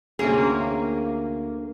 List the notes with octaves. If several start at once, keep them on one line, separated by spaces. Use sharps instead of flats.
D2 C3 A#3 C#4 G#4